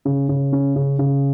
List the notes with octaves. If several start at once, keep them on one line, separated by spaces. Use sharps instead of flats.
C#3
C#3
C#4
C#3
C#3